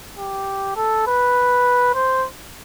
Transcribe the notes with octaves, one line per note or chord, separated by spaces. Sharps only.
G4
A4
B4
C5